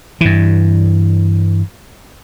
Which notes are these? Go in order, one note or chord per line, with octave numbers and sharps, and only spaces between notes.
G2 E3